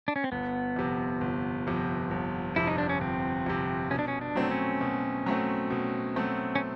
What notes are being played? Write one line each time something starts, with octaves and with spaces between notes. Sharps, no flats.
D4
C#4
C4
G1 B3
F2 C3
G1
F2 C3
G1
F2 C3 E4
D#4
D4
C#4
G1 C4
F2 C3
B2 C#4
D4
C#4
D4
F#3 A3 C4
C#4
B2
F#3 A3 C4
B2
F#3 A3 C4
C#4